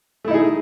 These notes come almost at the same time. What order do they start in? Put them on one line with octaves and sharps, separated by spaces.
A3 E4 D#4 G#4